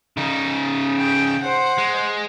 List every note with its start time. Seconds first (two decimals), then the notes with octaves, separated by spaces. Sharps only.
0.17 C#3 D#4
0.97 G5
1.43 C5 F#5
1.78 G#3